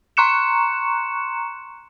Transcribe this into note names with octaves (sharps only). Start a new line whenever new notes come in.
A#5 C6 C#6 F#6 C#7 E7